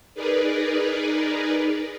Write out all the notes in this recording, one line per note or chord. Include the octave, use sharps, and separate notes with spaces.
D#4 G#4 A#4 B4 D5